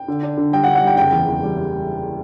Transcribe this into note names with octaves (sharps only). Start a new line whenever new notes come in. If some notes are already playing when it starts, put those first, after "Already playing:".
Already playing: G5
D3
D4
D3
G3 G5
F#5
D3
F#5
G3 G5
F#1 G5
E2
E2
G3
G3